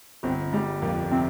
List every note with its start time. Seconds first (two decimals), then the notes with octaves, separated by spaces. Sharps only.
0.23 G1 C4
0.53 G3 G#3
0.82 F2 A#3
1.11 C3 C4